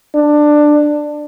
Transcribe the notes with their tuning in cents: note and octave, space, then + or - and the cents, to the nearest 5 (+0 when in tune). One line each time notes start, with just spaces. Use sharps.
D4 +15